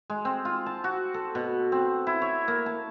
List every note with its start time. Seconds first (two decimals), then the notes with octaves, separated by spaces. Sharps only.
0.10 G#3
0.25 C4
0.45 F4
0.66 A5
0.84 F#4
1.14 A4
1.35 B2
1.72 C4
2.07 E4
2.22 C#5
2.48 A#3
2.66 A5